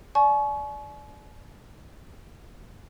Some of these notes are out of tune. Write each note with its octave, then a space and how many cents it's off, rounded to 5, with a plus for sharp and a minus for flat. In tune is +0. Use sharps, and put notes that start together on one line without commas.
D5 +0 G#5 +45 C#6 +0